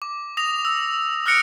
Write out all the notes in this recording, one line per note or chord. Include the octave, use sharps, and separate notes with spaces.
D6
D#6 A#6 F7
E6
D#6 F6 F#6 A#6 C#7 D7